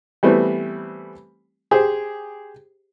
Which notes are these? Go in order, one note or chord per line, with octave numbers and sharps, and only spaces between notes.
E3 G3 A3 B3 C4
G4 G#4 C5